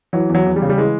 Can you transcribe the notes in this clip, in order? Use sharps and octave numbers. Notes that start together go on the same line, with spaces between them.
E3 F#3
E2
F#3
E2
G3
C#3
G3
E3 G#3